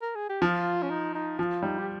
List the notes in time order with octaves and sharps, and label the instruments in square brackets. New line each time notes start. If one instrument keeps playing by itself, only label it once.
[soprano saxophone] A#4
G#4
G4
[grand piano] F3 [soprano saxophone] F4
[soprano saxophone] C#4
D#4
D#4
[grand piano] F3 [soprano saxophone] F4
[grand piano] G3 [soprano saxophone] D#4
[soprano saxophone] G4